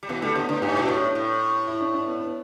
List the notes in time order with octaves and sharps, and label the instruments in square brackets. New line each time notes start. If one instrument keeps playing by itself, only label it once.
[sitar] G3
[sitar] B2 E3 [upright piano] B3
[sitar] D3 G3 [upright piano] A3
[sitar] D3 [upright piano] B3
[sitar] D3 [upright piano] D4
[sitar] G2 [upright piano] G4
[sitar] B2 [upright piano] E4
[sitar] A2 [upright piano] D4
[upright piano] E4
[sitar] A2
[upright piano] E4
D4
D4
B3
B3